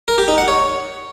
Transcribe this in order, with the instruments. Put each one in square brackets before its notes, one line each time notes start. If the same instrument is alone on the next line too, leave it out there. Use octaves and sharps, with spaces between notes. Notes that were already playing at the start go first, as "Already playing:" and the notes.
[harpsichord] A#4
G4
D#4
F#5
C#5